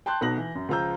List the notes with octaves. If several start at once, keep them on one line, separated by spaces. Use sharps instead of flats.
G5 A5 C6 F#6 G6
B1 B2 F#6 A#6 F#7
E3
F#2
C#2 F3 F4 A#5 E6 G6